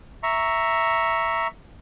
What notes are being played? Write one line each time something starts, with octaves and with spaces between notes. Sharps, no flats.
E5 A#5 C#6